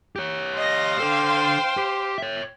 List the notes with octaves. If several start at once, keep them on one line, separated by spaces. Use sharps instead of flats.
G4 C#5
D#5 F5 C6 A#6
D4 A4 C5 G5
G4
C#5 E5